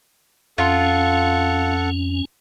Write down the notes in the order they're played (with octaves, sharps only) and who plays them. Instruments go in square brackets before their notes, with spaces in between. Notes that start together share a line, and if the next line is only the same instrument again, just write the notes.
[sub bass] F2 [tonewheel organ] C#4 [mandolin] F4 [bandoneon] A4 F#5